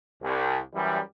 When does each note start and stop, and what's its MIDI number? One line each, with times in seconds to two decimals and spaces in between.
0.22 0.59 36
0.74 1.00 42
0.74 1.00 52
0.74 1.00 55